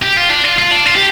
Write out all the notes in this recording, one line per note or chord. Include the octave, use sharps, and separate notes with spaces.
G4
F4
D4
F4
F4
D4
F4
G4